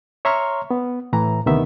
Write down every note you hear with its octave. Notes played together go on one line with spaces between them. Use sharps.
C#5 E5 A#5 C6 C#6 F6
B3
A2 E3 A#5
D2 C3 D#3 B3 E5